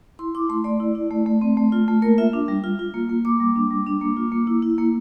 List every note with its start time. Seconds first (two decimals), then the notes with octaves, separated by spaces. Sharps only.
0.19 E4 C6
0.35 E4 D6
0.49 A3 C6
0.64 A3 D5
0.80 E4
0.95 E4
1.11 A3
1.26 A3
1.41 C4
1.57 A3
1.72 F4
1.88 A3
2.02 A#3 A#4
2.18 F4 E5
2.33 D4
2.48 G3
2.64 F4
2.79 F4
2.94 A#3
3.09 A#3
3.25 A#3 D6
3.40 G3
3.56 D4
3.71 G3
3.86 D4
4.01 A#3
4.17 F4
4.32 A#3
4.47 E4
4.62 E4
4.78 A#3